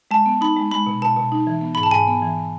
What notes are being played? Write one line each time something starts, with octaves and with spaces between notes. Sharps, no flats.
G#3 A5
B3
D#4 B5
G#3
G#3 B5
B2
B2 A5
B2
D#4
E3
B3
G#2 B5
A5
G#2 G#5
B3
E3